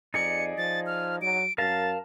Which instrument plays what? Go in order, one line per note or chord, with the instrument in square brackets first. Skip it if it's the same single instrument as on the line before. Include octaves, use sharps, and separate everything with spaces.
[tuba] F2 [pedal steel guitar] D#4 G#4 D5 [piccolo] C#7
[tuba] F3 [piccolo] A6
[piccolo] F6
[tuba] F#3 [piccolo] D7
[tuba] F#2 [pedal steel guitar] A#4 F5 A5 [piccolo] A6